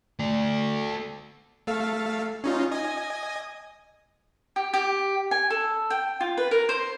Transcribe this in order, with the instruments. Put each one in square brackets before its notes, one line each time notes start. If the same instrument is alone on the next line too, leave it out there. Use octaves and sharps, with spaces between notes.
[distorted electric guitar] A3 D5
[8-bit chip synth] A3 A4 F5
C#4 D#4 F4
D#5 G#5 D#6
[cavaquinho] G4
G4
G#5
A4
G5
F4
B4
A#4
C5